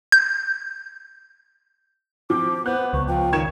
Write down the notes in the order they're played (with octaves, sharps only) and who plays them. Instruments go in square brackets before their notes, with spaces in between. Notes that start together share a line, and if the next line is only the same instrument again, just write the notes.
[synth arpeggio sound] G6
[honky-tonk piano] F3 C4 [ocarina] D6
[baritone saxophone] B3 [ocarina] C5 [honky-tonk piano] F#6 G6
[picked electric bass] C#2 [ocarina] C#6
[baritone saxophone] F3 [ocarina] G5
[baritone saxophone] D#3 [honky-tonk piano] C#6 G#6 E7